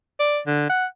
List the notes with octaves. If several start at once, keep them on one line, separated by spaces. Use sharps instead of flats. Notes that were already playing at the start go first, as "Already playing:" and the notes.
D5
D3
F#5